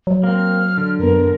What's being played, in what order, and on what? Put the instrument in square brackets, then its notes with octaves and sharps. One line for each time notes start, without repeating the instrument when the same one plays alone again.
[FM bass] F#3
[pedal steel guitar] A#3 C4 [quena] F6
[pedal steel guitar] D3
[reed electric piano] F#2 B3 [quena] A#4